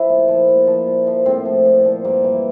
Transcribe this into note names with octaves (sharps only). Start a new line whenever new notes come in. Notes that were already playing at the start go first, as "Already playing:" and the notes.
Already playing: F3 E4
A#2
F3
A#2
F3
A#2
F3
A2 C4
F3
A#2
F3
G2 A#3
E3